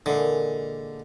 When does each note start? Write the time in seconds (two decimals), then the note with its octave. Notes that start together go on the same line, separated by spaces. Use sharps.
0.06 A#2 D3 E3 G#3